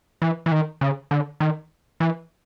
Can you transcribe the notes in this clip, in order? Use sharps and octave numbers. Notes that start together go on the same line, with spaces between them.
E3
E3
D#3
C#3
D3
D#3
E3